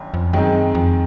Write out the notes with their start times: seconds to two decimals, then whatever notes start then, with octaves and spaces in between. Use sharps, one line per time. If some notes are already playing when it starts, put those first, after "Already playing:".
Already playing: G1 F#2 D#3
0.14 F2
0.33 F#2 D#3 G#3 C4 D#4
0.75 F2